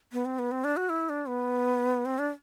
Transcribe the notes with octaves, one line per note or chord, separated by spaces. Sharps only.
B3
C4
B3
C4
D4
F#4
E4
D4
B3
C4
D4